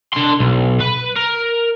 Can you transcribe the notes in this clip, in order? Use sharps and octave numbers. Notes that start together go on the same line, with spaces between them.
D4 C6
B1
B4
A#4